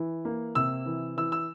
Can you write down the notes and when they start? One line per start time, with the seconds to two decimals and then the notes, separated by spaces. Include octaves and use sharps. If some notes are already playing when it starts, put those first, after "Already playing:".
Already playing: E3
0.25 A#3
0.55 C3 E6
0.86 E3
1.17 E3 E6
1.32 E6